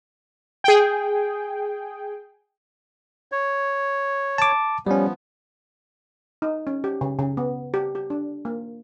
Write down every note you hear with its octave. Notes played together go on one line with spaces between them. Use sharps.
G#4 G5
C#5
A5 D6
F3 G3 B3 C#4
D#4
C#4
G4
C#3
C#3
B3
G4
G4
D4
A#3